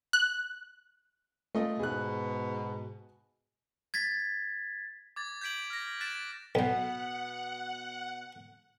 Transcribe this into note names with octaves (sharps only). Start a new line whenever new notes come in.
F#6
A3 F4 D#5
G#2 B2 G#4 F#6
G#6 A6 B6
D6 G#6 A6
G6 G#6 B6 D7 F#7
F6 A#6
F#6 A6 B6 D7 E7
B1 B2 B3 F#5